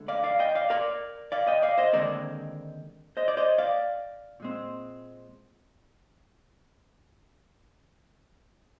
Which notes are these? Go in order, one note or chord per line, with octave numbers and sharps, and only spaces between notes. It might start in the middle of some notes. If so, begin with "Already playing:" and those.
Already playing: D2 D3 G#3
D5 F5
D5 F5
D#5 G5
D5 F5
A#4 D5
D5 F5
D#5 G5
D5 F5
C5 D#5
D#2 D3 G#3 C4 A#4 D5
C5 D#5
D5
C5 D#5
D5 F5
A#2 G#3 C4